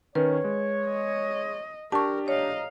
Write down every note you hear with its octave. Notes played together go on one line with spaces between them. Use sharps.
D#3 C#4 B4 C#5
G#3
D#5
D4 G4 A#4 A5 C#6
A#1 A2 C#5 D#5 F5 A#5